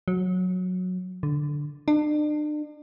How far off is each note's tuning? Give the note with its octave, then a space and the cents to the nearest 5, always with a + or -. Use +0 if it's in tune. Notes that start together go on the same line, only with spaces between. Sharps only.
F#3 -15
D3 +0
D4 +40